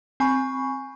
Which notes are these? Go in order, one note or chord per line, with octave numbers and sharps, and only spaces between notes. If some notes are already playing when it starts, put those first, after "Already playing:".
C4 G#5 B5 C#6